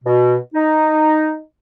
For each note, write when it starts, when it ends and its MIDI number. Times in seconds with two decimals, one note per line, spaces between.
0.04 0.36 47
0.55 1.41 63